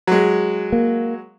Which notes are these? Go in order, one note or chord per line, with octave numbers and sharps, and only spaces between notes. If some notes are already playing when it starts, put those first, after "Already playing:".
F#3 G#3
A#3